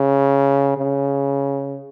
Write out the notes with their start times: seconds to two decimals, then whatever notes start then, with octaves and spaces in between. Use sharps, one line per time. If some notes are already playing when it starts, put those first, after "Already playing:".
Already playing: C#3
0.77 C#3